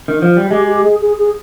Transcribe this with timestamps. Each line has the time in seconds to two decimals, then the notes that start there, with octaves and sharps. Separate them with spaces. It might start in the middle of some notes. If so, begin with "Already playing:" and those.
0.08 D#3
0.22 F3
0.37 G3
0.49 G#3 G4
0.67 G4
0.84 G#4
1.01 G#4
1.18 G#4